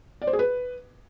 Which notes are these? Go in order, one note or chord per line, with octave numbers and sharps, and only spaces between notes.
D5
C5
G#4
B4